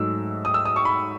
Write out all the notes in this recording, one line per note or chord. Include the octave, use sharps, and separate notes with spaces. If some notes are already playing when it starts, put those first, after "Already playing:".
Already playing: G#2 F#3 A3 D#4 E6
D#6
E6
D#6
C#6
B5